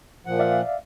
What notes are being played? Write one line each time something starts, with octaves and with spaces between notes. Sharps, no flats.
A#2 F3 F#5
D5 E5 F5